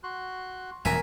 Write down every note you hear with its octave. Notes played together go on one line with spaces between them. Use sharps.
F#4 C6 F#6
E1 F2 A#2 C#4 A#4 E5 G#5 A#5